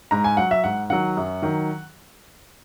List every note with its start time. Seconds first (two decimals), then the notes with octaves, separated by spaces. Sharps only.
0.11 G#2 A#5
0.24 G#5
0.37 F#3 F#5
0.51 E5
0.64 G#2 F#5
0.90 D#3 F#3 F#5
1.17 F#2
1.42 D#3 F#3